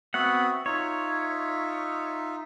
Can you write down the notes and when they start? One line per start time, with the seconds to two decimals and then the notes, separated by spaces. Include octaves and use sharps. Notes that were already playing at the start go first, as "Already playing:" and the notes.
0.14 B3 C4 F#4 E5 F#5 D#6
0.66 D#4 F4 C#5 E5